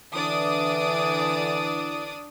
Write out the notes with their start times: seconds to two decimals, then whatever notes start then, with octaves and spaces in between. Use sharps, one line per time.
0.14 D3 E3 D4 D5 D#6